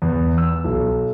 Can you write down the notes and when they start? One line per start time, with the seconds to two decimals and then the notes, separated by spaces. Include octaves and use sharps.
0.02 E2
0.38 E6
0.64 B1